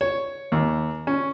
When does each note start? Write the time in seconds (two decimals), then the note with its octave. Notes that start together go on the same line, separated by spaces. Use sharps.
0.01 C#5
0.52 D#2
1.07 C#4